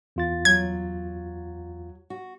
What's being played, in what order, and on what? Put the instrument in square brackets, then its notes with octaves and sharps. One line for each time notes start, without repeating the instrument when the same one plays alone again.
[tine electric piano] E2 F4 A6
[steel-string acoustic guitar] F#3 [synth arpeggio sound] G#6
[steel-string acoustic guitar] F#4